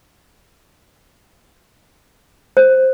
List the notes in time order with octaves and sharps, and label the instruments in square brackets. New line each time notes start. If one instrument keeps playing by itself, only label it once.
[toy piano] C5